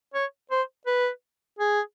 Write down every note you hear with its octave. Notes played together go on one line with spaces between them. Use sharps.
C#5
C5
B4
G#4